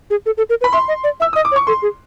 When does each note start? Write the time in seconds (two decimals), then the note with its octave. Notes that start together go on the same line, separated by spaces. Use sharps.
0.10 G#4
0.26 A4
0.38 A4
0.50 A#4
0.61 B4
0.64 B5
0.73 E5 C6
0.88 D#5
1.04 D5
1.20 E5 E6
1.33 D#5 D#6
1.45 D6
1.52 C#5
1.56 C#6
1.67 A4 C6
1.82 G#4